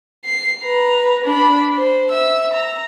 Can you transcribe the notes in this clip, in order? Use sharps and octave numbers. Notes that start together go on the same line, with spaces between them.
C7
B4 A#5
D4 B5
C5
E5 E6
A#5